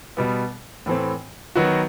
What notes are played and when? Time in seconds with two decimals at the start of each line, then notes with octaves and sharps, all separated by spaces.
0.17 B2 G3 B3
0.86 A2 E3 A3 C4
1.55 D#3 F#3 B3 F#4